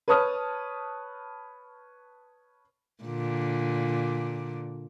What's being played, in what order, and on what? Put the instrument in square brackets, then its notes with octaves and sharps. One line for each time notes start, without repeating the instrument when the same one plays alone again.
[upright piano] B4 C#5 A5 D#6 F6
[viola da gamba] A#2 D3